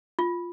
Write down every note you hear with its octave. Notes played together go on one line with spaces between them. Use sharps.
F4